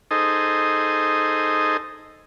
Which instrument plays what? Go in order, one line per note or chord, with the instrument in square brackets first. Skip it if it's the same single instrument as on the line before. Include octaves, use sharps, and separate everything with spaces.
[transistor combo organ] D#4 G#4 A4 C5 D#5